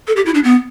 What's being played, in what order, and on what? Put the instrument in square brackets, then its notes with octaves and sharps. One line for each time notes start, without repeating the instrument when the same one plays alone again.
[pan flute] A4
G4
E4
D4
B3